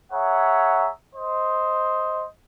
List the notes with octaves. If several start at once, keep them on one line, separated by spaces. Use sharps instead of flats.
G#4 C#5 E5 F#5 A#5
C5 D#5